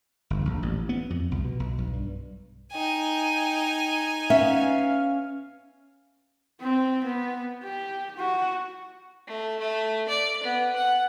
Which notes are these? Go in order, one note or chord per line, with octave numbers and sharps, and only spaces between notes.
G1
A#1
A1
B3
F2
C2
B2
B1
B1
G2
D#4 G5 G#5
B3 C#4 E5 F5
C4
B3
G4
F#4
A3
A3
D5
B3
F#5